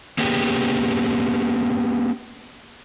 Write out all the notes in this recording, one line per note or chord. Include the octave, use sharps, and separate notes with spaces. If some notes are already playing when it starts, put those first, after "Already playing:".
A#3 B3 C#4 G4 G#4